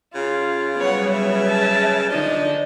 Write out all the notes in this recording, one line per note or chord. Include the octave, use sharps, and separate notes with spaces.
C#3 F4
F#3 G3 B3 C#5 F#5
E5
A5
D3 F3 D4 D#4 D#5